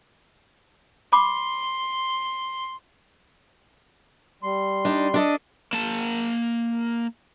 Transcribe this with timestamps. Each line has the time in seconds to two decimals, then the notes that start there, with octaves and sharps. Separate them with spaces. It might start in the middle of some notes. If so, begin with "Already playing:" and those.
1.13 B5 C6 D6
4.43 G3 C6
4.85 D4 D#4
5.14 D4 A4 D#5
5.73 A#3 A5